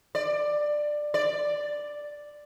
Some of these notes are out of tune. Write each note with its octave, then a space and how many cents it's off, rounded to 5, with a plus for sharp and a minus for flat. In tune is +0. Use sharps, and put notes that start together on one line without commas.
D5 +15
D5 +5